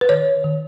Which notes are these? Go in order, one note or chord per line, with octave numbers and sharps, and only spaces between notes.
B4
D#3 C#5
D#3